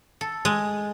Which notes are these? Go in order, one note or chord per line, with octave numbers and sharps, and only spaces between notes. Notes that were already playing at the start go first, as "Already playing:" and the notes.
A4
G#3